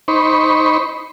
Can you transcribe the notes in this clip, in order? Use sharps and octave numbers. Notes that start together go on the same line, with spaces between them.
D#4 C5 B5 C#6